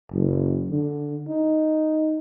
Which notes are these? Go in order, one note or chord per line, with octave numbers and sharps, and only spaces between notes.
F#1
D3
D#4